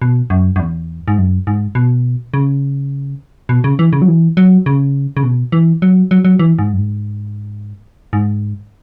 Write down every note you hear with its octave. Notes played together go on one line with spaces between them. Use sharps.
B2
F#2
F#2
E2
G#2
F#2
G#2
B2
C#3
B2
C#3
E3
C#3
F#3
E3
F#3
C#3
C#3
B2
E3
F#3
F#3
F#3
E3
G#2
F#2
G#2
G#2